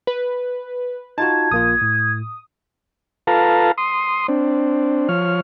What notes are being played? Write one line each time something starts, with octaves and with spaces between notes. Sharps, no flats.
B4
D#4 F4 F#4 A5 G#6
A#1 A#3 F4 D#6
A2
F4 A4 B4 F5 A5 A#5
C6 D#6
C4 D4
F3 C#5 F6